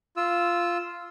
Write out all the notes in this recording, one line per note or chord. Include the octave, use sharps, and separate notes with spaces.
F4 E6